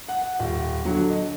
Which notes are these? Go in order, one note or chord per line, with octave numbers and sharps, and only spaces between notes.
F#5
D#1
D3 F#3
D#5